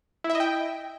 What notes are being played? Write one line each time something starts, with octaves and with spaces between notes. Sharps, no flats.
E4
E5
D#5
G5